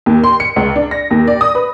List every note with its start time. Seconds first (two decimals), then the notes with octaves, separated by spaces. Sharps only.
0.06 D#2
0.24 C6
0.40 C#7
0.56 C#2
0.76 D4
0.91 A#6
1.11 D#2
1.27 D5
1.41 D#6
1.55 B4